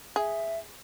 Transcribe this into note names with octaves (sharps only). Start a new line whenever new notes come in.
G#4 E5